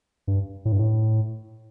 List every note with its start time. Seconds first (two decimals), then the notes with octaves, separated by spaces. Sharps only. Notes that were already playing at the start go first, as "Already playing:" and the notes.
0.27 G2
0.65 A2
0.72 G2
0.79 A2